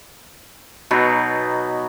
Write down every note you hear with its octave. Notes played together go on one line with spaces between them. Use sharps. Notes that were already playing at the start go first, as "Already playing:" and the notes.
B2 F#3 B3 D#4